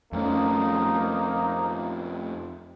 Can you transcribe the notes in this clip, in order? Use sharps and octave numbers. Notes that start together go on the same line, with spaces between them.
F2 F3 A3 A#3 C#4 D#4